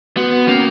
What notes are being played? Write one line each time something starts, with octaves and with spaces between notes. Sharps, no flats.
B3 F#4
A#3 C#4